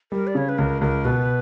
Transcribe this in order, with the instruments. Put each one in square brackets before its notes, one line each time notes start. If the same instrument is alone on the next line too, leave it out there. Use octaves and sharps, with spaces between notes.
[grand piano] G3 [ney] A#4
[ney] D5
[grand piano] C#3 [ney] C#5
[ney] B4
[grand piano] C#2 [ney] A#4
[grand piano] C#2 [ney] A#4
[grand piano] B2 [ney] B4